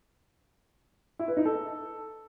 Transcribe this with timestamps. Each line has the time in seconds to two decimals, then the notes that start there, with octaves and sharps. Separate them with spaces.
1.19 E4
1.28 B4
1.37 D#4
1.45 A4